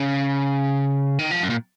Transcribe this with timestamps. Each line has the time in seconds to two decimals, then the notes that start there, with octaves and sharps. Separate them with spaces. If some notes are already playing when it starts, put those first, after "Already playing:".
Already playing: C#3
1.19 D#3
1.31 F3
1.43 F#2
1.50 A#2